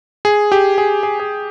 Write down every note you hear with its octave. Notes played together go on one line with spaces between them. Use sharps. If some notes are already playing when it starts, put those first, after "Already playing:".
G#4
G4
G#4
G#4
G#4